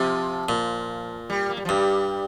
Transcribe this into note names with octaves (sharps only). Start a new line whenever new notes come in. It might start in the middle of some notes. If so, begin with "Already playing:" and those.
Already playing: C3 F3
A#2
G3
A#3
G3
F3
G2 G3